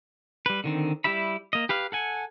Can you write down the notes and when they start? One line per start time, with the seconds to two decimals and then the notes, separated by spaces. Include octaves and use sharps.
0.46 G3 B4
0.64 D3 D#3 C4
1.04 G3 E4 G4 E5 B5
1.53 A#3 D#5
1.69 G4 B4 F5
1.92 A4 F#5 G#5